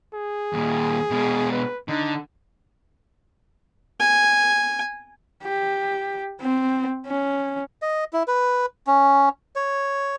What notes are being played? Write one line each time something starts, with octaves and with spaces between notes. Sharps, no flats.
G#4
D#2 A#2
B2 G#3
B4
D3 D#4
G#5
G4
C4
C#4
D#5
E4
B4
C#4
C#5